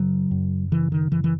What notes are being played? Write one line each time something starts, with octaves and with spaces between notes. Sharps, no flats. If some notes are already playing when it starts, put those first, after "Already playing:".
Already playing: F#2 C#3 F#3
F#2
C#3 E3
D#3
F#2 E3
E3